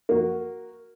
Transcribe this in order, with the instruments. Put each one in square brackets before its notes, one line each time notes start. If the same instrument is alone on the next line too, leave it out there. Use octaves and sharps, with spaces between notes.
[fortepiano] A#3 F#4